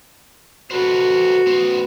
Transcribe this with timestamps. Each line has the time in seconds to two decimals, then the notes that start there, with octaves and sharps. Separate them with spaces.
0.71 F#4 A4 B4 C5
1.47 B3 C5